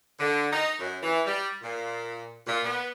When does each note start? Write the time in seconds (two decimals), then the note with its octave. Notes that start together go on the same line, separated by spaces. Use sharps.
0.19 D3
0.52 D#4
0.80 F#2
1.03 E3
1.26 G3
1.62 A#2
2.47 A#2
2.65 B3